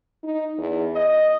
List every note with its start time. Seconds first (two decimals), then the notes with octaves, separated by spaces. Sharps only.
0.24 D#4
0.58 E2
0.95 D#5